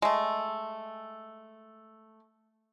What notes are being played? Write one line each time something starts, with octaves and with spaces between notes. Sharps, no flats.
G#3 A3